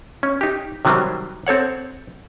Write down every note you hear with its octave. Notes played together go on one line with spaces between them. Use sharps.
C#4
D#4 G4
C3 D#3 F#3 G3 C4
C4 A4 C#5 F#5